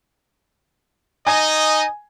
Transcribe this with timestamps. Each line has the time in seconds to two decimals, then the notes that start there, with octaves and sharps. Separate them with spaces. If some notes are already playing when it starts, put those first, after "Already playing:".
1.27 D#4 D#5 G#5